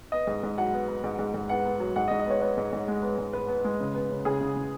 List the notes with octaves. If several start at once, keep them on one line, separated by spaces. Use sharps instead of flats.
B3 D#5
G#2
G#2
F#3 F#5
B3
B3
G#2
G#2
G#2
B3 F#5
B3
F#3
G#2 F#5
D#5
G#2
D#5
B3 C#5
B3 C#5
G#2
G#2
G#3
B3
G#2
B3 B4
B3
G#3
C#3
B3
C#3
C#3 G#4
C#3
C#3